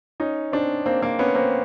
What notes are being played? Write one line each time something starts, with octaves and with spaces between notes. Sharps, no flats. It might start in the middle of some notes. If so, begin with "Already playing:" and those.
C#4 D#4
C4 D4
A#3 C4
A#3 C4
B3 C#4
A#3 C4